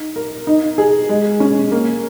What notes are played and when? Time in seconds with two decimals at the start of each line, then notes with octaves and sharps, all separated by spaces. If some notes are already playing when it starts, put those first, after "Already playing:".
Already playing: D#4
0.16 A#4
0.47 D#4
0.78 G#4
1.09 G#3
1.40 C#4
1.72 A#3